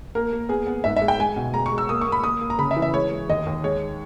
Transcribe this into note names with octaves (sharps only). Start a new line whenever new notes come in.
A#3 A#4
A#3
B3 G#4
B3
G#2 E5
E5
G#3
G5
G#3 G#5
B2
G#3 A#5
C#6
G#3
E6
A#3 D#6
C#6
A#3
B5
A#3 D#6
A#3
A#5
C#3 B5
E5
E3
E5
G#3 C#5
G#3
D#2 D#5
D#2
G#3 C#5